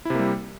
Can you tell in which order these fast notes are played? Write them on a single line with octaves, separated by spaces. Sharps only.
E4 C3 A#3 G3